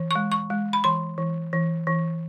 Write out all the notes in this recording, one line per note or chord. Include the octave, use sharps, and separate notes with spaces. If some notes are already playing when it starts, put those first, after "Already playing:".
Already playing: E3
G#3 C#6
C#6
G#3
B5
E3 C6
E3
E3
E3